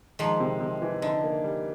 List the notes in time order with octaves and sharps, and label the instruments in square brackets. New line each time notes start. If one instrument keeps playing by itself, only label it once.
[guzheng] D#3 F3 [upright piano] G#3
[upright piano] C3
C3
E3
[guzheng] D3 [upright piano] D#4
[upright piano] A#3
G3